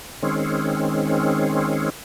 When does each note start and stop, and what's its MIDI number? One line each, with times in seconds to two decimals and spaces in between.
0.22 1.90 51
0.22 1.90 56
0.22 1.90 60
0.22 1.90 61